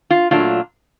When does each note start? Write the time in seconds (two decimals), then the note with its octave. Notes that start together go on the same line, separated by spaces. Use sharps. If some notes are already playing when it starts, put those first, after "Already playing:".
0.10 F4
0.31 A#2 F#3 A3 D4 F4